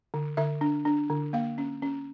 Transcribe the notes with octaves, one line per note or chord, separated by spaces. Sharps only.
D3
D3 E5
D4
D4
D3
A#3 F5
C#4
C#4